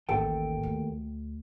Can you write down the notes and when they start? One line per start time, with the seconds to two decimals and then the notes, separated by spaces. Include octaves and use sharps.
0.09 A1 D#2 A4 G5
0.63 D2